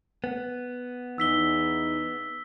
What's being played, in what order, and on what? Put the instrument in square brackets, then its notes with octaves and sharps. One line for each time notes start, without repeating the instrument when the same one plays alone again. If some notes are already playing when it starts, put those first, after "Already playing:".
[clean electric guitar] B3
[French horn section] E2 E3 D#4 [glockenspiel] E6 B6 G7